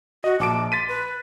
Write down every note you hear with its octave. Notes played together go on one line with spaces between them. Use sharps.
F#4 D#5
A#1 A5 D6 D7
C6 A6 B6 D#7
B4